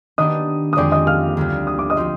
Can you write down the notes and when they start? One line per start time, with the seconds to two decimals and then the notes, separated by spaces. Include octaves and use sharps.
0.18 D#3 B3 D4 G4 D#5 D#6
0.73 D#6
0.76 F2 D3 G#3 C4 G4 D5 D6
0.92 D#5 D#6
1.07 F5 F6
1.37 D2 D3 G3
1.67 D#6
1.79 D6
1.90 D#5 D#6
1.97 F3 C4 F4